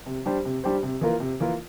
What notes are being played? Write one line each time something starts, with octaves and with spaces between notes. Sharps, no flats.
C3
G3 D4 G4 C5
C3
G3 D4 G4 C5
C3
E3 A#3 F4 A#4
C3
E3 A#3 F4 A#4